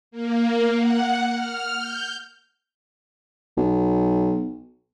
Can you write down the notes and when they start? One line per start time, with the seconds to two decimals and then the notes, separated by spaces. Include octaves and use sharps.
0.11 A#3
0.76 F#5
1.33 F6
1.77 G6
3.57 B1